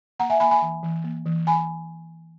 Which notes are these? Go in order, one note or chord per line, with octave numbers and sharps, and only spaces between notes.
A#3 F#5 A#5
E5 G#5
A#3 G#5 B5
G#5 B5
E3
E3
A#3
E3
E3 G#5 B5